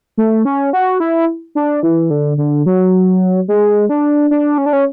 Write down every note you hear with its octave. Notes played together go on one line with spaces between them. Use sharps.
A3
C#4
F#4
E4
D4
E3
D3
D3
F#3
G#3
D4
D4
C#4
D4
C#4